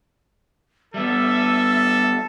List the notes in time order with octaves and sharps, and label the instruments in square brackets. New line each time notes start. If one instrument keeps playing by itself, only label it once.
[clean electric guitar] G3 B3 [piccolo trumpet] A4 [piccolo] E5